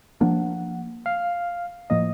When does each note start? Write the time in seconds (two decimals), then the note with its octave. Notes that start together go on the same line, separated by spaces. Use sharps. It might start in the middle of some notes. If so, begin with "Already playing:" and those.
0.21 F3 A#3 D4 F#5
1.06 F5
1.90 A2 F3 A#3 D#5